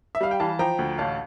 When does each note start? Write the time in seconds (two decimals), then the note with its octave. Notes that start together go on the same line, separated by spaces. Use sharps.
0.15 E5
0.21 G3 F5
0.31 G5
0.40 E3 F5 A5
0.59 F3 G5 A#5
0.79 D2
0.98 A1 F5 A5